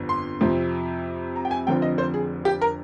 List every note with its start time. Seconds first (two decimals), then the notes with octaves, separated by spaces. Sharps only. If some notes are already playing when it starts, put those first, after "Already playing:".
Already playing: G1 F2 D3
0.09 C6
0.41 F2 C3 F3 C4
1.36 A#5
1.45 G5
1.51 G#5
1.67 F1 F2 D3 F3 C4 G5
1.82 D#5
1.98 C5
2.14 G#4
2.45 G4
2.61 A#4